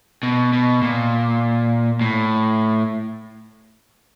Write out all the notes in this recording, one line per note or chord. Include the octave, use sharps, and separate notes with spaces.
B2
B2
A#2
A2